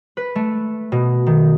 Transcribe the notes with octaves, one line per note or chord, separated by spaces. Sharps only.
B4
A3
B2
D#3